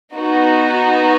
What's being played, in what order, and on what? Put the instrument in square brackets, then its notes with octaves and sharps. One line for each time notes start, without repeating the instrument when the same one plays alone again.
[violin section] B3 D#4 F#4